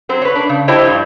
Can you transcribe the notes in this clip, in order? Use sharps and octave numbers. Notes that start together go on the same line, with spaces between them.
F#3 C4 C5
B4 C#5
D4
C#3
D4 E4 G4 C5 C#5 D#5
G2 F3